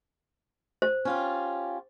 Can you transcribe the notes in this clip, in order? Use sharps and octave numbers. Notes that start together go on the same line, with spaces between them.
C5
C#4 F4 G4